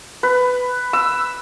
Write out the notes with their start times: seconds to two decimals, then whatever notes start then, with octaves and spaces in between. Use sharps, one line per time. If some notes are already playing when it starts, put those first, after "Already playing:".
0.23 B4
0.93 E6